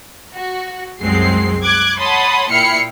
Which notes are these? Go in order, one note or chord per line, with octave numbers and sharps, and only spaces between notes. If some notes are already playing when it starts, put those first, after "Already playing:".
F#4
C2 F#2 F#3 G#3 C4 C7
D6 F#6 G#6
C#5 F#5 A5 B5 C6 D#6
A#2 E4 G5 F6 C7 C#7